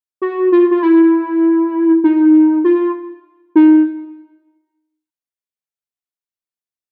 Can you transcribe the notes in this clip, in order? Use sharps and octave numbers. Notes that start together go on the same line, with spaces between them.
F#4
F4
F4
E4
D#4
F4
D#4